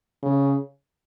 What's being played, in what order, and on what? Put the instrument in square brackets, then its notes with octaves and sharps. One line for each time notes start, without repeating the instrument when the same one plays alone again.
[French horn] C#3